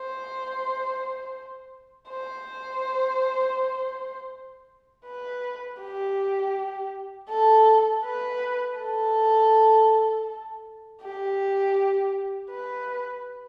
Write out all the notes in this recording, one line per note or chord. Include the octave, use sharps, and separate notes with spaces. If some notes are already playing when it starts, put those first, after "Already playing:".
Already playing: C5
C5
B4
G4
A4
B4
A4
G4
B4